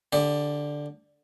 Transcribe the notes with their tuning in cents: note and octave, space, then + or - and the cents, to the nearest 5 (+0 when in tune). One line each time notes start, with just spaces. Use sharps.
D3 +0 G4 +30 D5 +0